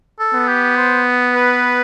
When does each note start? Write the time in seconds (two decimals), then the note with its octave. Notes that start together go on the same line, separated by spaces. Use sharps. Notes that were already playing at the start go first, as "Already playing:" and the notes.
0.19 A4
0.34 B3
0.48 G4
0.77 C5
1.34 B4